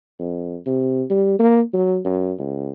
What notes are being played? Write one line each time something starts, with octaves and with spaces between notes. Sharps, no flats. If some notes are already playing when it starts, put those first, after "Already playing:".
F2
C3
G3
A#3
F#3
F#2
C#2